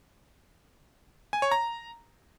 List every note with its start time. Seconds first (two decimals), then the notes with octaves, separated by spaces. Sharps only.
1.33 G#5
1.42 C#5
1.51 A#5